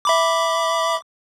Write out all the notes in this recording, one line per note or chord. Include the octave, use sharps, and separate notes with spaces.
E5 B5 D6